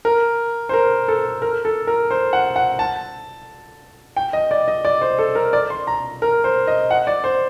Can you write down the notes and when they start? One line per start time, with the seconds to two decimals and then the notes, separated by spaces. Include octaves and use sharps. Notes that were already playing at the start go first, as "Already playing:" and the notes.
0.05 A#4
0.69 C5
0.73 A#4
1.08 A4
1.42 A#4
1.65 A4
1.87 A#4
2.11 C5
2.33 F#5
2.56 F#5
2.79 A5
4.16 G5
4.33 D#5
4.51 D5
4.68 D#5
4.85 D5
5.01 C5
5.18 A4
5.35 A#4
5.53 D5
5.70 C6
5.87 A#5
6.22 A#4
6.44 C5
6.67 D#5
6.91 F#5
7.07 D5
7.24 C5